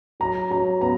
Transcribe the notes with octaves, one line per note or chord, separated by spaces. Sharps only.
F#3 A#5
F#3 A#5
B3 A#5